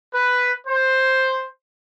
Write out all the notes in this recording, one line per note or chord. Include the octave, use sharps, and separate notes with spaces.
B4
C5